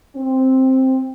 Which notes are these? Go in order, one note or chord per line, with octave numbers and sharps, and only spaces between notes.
C4